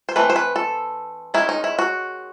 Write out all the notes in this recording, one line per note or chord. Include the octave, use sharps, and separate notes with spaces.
C5
E3 A3 C4 B4
C5
B4
A4
D#3 G#3 C#4 E4
D#4
E4
F#4